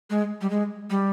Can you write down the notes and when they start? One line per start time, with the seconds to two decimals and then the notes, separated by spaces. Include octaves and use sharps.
0.10 G#3
0.41 G3
0.50 G#3
0.90 G3